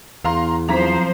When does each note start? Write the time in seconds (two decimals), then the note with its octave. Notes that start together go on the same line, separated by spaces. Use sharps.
0.24 E2 F5 A#5 C6
0.69 F3 F#3 C4 C5 A#5 B6